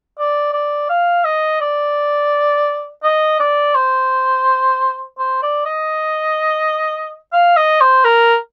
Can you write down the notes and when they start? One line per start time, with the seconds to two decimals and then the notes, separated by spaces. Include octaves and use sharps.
0.19 D5
0.53 D5
0.89 F5
1.25 D#5
1.61 D5
3.03 D#5
3.40 D5
3.75 C5
5.19 C5
5.43 D5
5.66 D#5
7.33 F5
7.57 D#5
7.81 C5
8.04 A#4